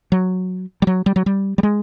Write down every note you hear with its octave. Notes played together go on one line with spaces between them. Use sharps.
F#3
G3
F#3
G3
F#3
G3
G3
G#3